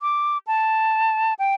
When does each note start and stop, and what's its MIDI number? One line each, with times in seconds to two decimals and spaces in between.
0.01 0.38 86
0.47 1.34 81
1.39 1.55 79